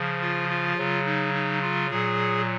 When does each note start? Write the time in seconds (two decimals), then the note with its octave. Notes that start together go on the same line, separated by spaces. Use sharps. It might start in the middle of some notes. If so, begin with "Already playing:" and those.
Already playing: C#3 F3
0.21 F4
0.49 F4
0.77 C#3 F#3
1.05 D#4
1.34 D#4
1.62 F4
1.90 A#2 F#3 G#4